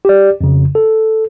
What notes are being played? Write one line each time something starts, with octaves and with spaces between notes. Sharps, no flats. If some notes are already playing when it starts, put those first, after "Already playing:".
G4 D5
F2 C#3
A4